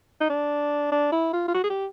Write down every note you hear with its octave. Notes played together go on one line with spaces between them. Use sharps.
D#4
D4
D4
E4
F4
F4
F#4
G#4
G4